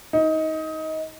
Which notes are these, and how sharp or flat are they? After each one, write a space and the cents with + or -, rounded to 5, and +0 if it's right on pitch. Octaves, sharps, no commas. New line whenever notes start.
D#4 +20